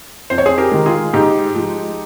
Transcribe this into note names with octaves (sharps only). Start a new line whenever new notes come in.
F2 C5
C#5
G#4 C5
G4 A#4
D#3 G#3
F4 G#4
G#2 D#4 G4
F3 G#3